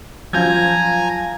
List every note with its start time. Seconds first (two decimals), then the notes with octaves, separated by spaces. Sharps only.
0.33 F3 F#3 G#5 A#5 G6 G#6